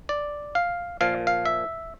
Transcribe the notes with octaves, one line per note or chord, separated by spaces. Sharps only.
D5
F5
A#2 F3 F5
F5
E5